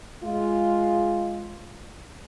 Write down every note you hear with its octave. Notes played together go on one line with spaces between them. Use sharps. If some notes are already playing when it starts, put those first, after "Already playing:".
G#3 F4